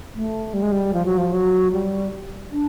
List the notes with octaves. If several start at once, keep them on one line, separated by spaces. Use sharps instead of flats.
A3
G3
G#3
G3
F3
F#3
F3
F#3
G3
D4